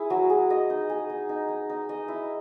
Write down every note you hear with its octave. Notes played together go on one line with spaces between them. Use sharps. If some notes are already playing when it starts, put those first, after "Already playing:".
Already playing: E4 G#4
F#3
G#4
D#5
D#4
G#4
D#4
D#4
D#4
D#4
D#5
E4